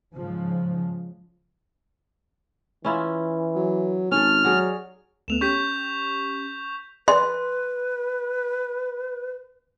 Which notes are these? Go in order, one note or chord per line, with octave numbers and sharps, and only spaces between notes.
G#2 C#3 F3
E3 C#4 E4 F4
F#3
G#1 C#4 A4 F6
F#3 F#4 G#4 D5
D2 A3 B3 E7 F7
C#4 G4 C#6 G6 B6
G#4 B4 D5 C6